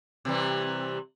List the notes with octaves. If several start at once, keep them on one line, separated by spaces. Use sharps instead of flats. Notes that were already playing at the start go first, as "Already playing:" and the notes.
C3 E3 G3